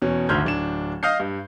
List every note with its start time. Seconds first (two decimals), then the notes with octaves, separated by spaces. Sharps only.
0.02 E2 B2 C#4
0.29 G#1 D2 C6 F6 G6 G#6
0.44 D1 D4 E7
1.03 D#5 F5 D#6 F6 G6 C7
1.20 G2